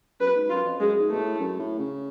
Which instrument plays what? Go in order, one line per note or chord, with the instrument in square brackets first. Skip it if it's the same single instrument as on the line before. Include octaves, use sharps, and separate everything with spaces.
[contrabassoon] F#2 [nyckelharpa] B4
[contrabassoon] G#2
[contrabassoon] F#2 [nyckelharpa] F4
[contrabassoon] F2
[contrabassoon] F#2 [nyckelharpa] G#3
[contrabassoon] G#2
[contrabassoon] B2 [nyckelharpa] A3
[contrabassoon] A2
F#2
A2
C#3